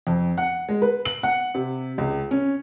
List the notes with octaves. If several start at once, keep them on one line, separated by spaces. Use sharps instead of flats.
F2
F#5
G#3
B4
F#7
F#5
C3
C#2
C#4